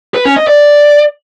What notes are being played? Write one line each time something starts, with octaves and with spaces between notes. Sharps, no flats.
B4
C#4
D#5
D5